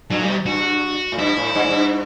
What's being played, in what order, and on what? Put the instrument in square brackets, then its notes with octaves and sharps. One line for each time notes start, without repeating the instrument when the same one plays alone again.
[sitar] G2 [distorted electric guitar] F#3
[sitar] A2
[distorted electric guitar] G3
[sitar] B2
[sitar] G2 [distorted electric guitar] F#4
[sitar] A2
[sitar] G2 [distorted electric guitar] E4
[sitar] A2
G2
A2
G2